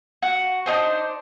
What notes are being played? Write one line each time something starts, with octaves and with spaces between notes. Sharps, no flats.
F#4
D4 D#4 G#4 C5